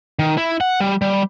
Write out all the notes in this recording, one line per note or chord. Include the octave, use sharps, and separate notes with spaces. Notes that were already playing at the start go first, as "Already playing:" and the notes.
D#3
E4
F#5
G3
G3